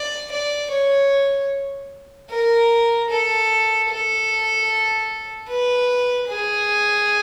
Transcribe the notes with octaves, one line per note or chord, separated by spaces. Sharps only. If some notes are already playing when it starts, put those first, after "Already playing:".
Already playing: D5
D5
C#5
A#4
A4
A4
B4
G#4